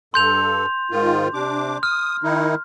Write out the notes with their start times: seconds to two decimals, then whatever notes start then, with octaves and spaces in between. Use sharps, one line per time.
0.14 G2 A4 C6 G6 F7
0.91 G#2 D#3 F4
1.34 C3 D4 D6
1.83 D#6 F6
2.23 D#3 D#4 E4